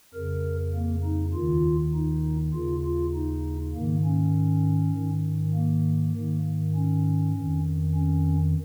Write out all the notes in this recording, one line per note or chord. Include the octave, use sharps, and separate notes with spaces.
F2 C#3 A#4
A#3
D#4
D#2 D#3 F4
D#4
D#2 C#3 F4
F4
D#4
G#2 D#3 A#3
C#4
G#2 D#3
A#3
G#2 D#3
C#4
F2 D#3
C#4